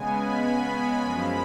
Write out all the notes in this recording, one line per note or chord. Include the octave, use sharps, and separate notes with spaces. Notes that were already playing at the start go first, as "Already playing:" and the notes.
Already playing: C#3 G#3 B3 G#5
B5
B5
F#2 F3 G#3